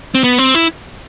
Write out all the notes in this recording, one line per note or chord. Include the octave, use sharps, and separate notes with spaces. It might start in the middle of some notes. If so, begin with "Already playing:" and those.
C4
B3
C4
E4